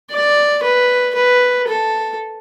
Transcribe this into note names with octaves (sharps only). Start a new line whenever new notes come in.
D5
B4
B4
A4